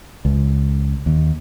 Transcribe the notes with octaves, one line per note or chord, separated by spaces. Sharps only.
C#2
D#2